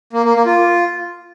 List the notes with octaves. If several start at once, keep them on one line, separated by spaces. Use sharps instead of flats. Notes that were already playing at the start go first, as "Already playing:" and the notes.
A#3
A#3
A#3
F4